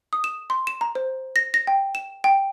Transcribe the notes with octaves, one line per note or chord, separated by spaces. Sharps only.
D#6
E7
C6
E7
A#5
C5
A#6
A#6
G5
E7
G5